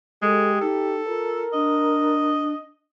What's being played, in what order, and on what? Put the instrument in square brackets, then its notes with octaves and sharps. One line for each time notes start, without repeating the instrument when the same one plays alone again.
[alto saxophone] G#3 [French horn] G4 [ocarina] A4
[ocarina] D#4 [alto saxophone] A4
[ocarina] F4 [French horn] A#4
[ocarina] D4 [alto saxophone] D#5